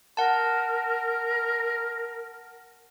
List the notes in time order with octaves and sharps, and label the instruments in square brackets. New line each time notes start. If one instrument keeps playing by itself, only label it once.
[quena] A#4 [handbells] F#5 A5